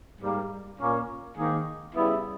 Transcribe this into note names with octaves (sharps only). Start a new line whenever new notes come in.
G#2 G3 A#3
A#2 A#3 C#4
G#2 D#3 A#3 D#4 G#4
C#3 G3 B3 E4